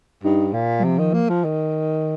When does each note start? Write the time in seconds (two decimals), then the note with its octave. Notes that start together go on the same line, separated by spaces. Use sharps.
0.24 G2 D#4
0.54 A#2
0.79 G3
0.83 C3 F3
0.99 D#3
1.14 A#3
1.29 F3
1.44 D#3